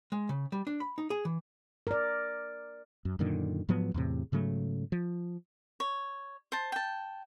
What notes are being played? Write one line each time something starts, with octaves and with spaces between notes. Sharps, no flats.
G#3
C#3
G3
D4
B5
D#4
G#4
E3
A#4 D5
F#2
F#2 A#2 D3 D#3
G#2 F3 F#3 B3
E2 A2 C3
G#2 C#3 F#3 A3
F3
C#5
C5 A5
G5 A5